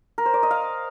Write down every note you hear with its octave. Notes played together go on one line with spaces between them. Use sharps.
A#4
C5
D5
D#5
F5